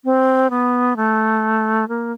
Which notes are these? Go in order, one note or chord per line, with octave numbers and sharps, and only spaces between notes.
C4
B3
A3
A#3